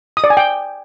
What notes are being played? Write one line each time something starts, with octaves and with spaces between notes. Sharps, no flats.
D#6
D5
G#5
G5